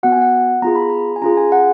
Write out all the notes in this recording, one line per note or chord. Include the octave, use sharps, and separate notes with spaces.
B3 F#4 F#5
G#5
F#5
B3 F4 G#4 A#5
B5
A#5
G#5
C#4 F4 G#4 A#5
G#5
F#5